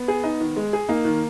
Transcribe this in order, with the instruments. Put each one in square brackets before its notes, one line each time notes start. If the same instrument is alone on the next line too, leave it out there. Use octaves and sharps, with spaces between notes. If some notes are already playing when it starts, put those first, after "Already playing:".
Already playing: [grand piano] B3
[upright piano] G#4
D#4
D#3
G#3
G#4
[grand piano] A#3 [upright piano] D#4
[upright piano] D#3